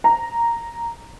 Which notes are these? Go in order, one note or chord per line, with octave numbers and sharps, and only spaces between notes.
A#5